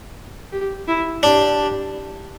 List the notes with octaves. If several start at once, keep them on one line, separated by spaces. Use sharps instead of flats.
G4
E4
D4 G4